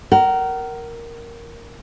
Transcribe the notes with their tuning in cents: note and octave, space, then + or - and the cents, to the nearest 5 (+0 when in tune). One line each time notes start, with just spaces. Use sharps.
A#4 +0 F#5 +40